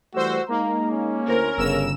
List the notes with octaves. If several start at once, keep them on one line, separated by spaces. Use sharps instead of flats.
E3 G3 A3 F#4 C5 E6
G#3 A#3 D#4 A#5
C#4
D2 E4 A#4 C5
G1 C#3 E6 E7